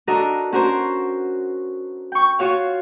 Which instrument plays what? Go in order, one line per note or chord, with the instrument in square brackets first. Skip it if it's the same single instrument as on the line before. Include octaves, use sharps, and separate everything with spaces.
[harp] D4 D#4 F#4 A4 A#4 D#5
C#4 F#4 A#4 C5
G5 C#6
F4 F#4 C#5 F5